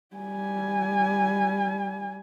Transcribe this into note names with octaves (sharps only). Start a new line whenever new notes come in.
G3 G#5